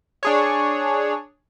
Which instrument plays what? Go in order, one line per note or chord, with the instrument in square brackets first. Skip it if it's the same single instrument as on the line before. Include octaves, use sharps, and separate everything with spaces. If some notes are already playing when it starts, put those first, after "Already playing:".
[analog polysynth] D4 G#4 C#5